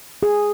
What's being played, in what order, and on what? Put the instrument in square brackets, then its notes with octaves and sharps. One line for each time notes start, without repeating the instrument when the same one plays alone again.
[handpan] G#4